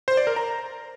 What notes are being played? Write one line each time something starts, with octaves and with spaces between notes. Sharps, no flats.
C5
D5
A#4
A#5